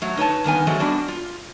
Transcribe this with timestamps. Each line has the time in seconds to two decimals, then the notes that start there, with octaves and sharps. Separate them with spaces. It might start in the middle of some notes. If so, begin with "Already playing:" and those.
0.02 F#3 A3
0.17 D#4 B4 C#5 A5
0.44 G2 D#3 B3 G#5
0.67 F3 F#3 G#3 A3 F#4
0.80 G3 B3 D4 F#4
1.08 F4